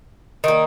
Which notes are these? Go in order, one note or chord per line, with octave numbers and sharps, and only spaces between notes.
D#3 A#3